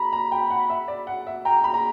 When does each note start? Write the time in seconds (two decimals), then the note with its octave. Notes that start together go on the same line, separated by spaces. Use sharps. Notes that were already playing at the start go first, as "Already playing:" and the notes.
Already playing: A#5 B5
0.13 A#5
0.32 G5
0.50 F#5
0.70 E5
0.88 D5
1.07 F#5
1.27 E5
1.45 G5 A#5
1.64 B5
1.74 A#5